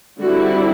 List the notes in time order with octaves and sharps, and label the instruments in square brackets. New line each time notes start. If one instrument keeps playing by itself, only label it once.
[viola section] D3 G3 C4 E4 F#4